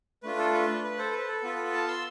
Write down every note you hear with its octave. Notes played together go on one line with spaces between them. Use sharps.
A3 D4 F4 B4
A4
B4
B4
A4 C5
B4
A4
B3 F4 A4 B4
F5 A5
C6 E6